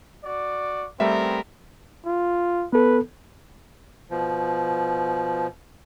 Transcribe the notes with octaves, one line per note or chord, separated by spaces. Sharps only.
F#4 D5
G3 A3 B3 C4 A#4 E5
F4
B3 A4 B4
B2 F3